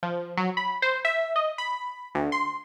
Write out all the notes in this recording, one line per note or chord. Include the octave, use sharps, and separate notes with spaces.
F3
F#3
B5
C5
E5
D#5
B5
D2
C6